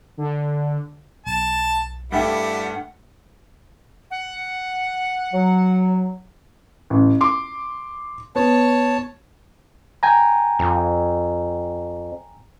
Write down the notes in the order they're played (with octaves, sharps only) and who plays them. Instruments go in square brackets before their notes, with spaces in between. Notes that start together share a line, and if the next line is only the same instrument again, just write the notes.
[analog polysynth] D3
[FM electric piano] B1 [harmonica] A5
[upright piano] G2 A3 G5 [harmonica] G3 E4 [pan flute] F#5
[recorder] F#5
[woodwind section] F#3
[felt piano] A1
C6 D6
[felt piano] B3 [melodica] C#5 A5
[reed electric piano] G5 G#5 A#5
[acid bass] F2